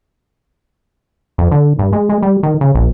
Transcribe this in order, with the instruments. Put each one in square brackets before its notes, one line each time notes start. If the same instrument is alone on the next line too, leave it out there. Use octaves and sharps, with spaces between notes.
[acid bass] F2
D3
G2
G#3
G#3
G3
D#3
C#3
A#1